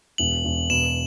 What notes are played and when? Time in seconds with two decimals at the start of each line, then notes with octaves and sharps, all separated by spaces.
0.18 E1 F#7
0.45 E1
0.70 B2 E7